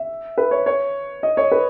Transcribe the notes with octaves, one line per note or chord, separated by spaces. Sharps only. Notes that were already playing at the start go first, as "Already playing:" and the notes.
Already playing: E5
B4
C#5
C#5
D#5
C#5
B4